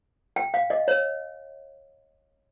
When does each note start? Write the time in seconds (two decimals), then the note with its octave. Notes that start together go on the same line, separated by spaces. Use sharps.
0.36 G5
0.54 F5
0.70 D#5
0.88 C#5